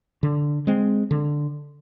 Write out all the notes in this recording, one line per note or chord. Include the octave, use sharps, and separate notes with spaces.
D3
G#3 C4
D3